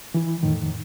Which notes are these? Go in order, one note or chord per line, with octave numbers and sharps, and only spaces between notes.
E3 E4
F2 A2 D#3